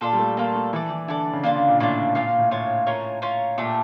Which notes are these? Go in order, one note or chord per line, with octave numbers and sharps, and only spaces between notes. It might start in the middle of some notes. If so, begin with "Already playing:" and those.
A#2 D4 F4 A4
G3
A3
A#3 D4 F4 A4
A3
E3 E4 A4 D5
E3
D3 E4 A4 D5
C#3
D3 A#3 D4 F4
C#3
A#2
A2 A#3 D4 F4
A#2 F4 C#5 F5
A#2
A2
A2 F4 C#5 F5
C#4 F4 A#4 C#5
C#4 F4 A#4 C#5
A#2 A3 D4 G4